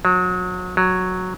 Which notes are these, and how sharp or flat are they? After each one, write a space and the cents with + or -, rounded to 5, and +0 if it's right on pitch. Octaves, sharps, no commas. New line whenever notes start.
F#3 -30
F#3 -5